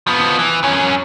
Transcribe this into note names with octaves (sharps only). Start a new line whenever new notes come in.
F3 B3
E3
F#2 C#4